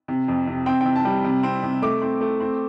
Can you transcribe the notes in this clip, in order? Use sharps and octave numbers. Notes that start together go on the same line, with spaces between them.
C3
F2
C3
C4 G5
C3 G5
A5
G3
C3
C4
C3
A3 D6
C4
A3
C4